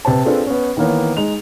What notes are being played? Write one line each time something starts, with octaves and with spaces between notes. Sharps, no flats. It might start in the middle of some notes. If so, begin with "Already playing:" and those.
C3 B4 C5 A5
C4 D4 F4 G#4 A4 B4
B3 C#4
D#3 E3 A#3 B3 C#5
G#3 D#4 F7